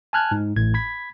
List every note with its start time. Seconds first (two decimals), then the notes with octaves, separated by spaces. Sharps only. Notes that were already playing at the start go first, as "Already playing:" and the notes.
0.13 G#5 A5 F6 F#6 G#6
0.31 G#2
0.56 A1 A2 G#6
0.74 B5 G#6 B6